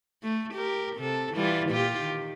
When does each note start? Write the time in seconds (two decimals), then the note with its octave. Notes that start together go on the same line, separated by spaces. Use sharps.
0.23 A3
0.54 G4 A#4
0.97 C3 A4
1.34 E3 G3 F4
1.70 A#2 F4 G4
2.00 D#3